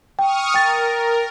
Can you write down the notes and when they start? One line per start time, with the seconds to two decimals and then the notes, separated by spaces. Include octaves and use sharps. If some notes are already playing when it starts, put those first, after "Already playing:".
0.19 G5 C#6 D#6 F6
0.54 A#4 G5 A6